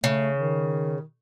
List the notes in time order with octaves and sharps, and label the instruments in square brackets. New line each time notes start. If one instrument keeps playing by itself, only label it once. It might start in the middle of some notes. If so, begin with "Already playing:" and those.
[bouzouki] C#3 [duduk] A3
[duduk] D#3